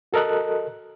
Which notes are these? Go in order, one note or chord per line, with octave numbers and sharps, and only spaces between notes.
F#4 A4 A#4 D#5 F#6